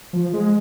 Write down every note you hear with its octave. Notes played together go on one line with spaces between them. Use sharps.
F3
G#3